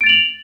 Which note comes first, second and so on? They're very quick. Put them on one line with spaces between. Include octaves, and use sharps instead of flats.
D7 A6 F7 F#7